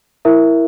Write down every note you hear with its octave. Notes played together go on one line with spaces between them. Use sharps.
E4 A#4 E5